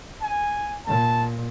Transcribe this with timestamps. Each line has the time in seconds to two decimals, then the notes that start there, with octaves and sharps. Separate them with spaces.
0.22 G#5
0.87 A#2 A5